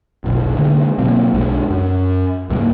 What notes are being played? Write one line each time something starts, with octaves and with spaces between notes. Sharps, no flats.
F1 B1
D3 D#3 G#3 A#3
B2 F#3 A#3 C4
B1 G2 G#3 D4
F#2
C#2 G#2 G3 A#3